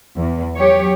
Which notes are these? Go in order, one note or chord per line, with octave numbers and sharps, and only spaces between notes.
E2
F#3 G4 C#5